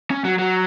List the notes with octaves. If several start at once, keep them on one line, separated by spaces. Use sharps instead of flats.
C#4
F#3
F#3